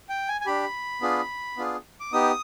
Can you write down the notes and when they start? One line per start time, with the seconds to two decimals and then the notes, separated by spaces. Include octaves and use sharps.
0.09 G5
0.28 G#5
0.41 G#5
0.46 D4 G4 B5
1.01 B3 D4 F4 G#4
1.57 B3 D4 F4 G#4
2.00 D6
2.12 B3 D#4 G4 D#6